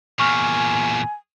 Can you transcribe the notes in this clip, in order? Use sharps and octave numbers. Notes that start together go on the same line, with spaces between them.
E2 A#2 G#5 C#6 F6